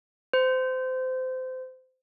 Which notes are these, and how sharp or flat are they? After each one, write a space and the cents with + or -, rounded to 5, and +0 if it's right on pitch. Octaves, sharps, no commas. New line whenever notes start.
C5 -25